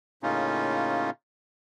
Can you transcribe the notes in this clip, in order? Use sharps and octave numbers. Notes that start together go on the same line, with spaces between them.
A2 C#3 A#3 C#4 D#4 F4